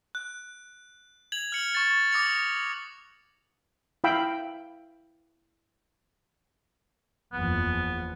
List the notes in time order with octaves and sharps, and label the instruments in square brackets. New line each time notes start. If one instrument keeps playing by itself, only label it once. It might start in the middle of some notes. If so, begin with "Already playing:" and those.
[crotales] F#6
G#6 F7 F#7
F6 C#7 F#7
C#6 A6
D6 D#6 A#6 C#7 F7
[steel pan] E4 F5 G5 B5 E6
[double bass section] F#1 E2 F3 [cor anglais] B3